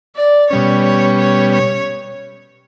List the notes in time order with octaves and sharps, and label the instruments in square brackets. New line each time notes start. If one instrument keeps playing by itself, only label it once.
[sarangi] D5
[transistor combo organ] B2 G3 C#4 [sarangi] C#5
[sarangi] C#5
C#5
C#5